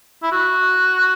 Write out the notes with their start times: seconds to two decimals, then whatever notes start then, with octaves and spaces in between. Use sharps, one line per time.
0.23 E4
0.32 F#4